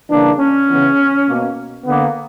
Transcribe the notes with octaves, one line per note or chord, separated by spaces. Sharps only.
C#3 E3 G3 A#3 D4
C#4
C#3 E3 B3
B2 A#3
D3 A#3 B3